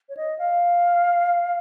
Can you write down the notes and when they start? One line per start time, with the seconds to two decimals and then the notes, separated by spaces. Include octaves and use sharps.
0.09 C#5
0.17 D#5
0.38 F5